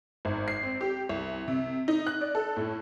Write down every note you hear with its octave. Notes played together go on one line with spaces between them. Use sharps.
G#1
C7
C4
G4
C2
C3
D#4
F#6
D5
A4
A2